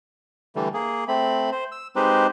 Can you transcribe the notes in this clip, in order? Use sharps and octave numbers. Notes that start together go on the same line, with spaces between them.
D3 E3 G3 A3
A#3 G#4
A3 C4 B5
C5
E6
G#3 C4 D#4 G4 B4 C5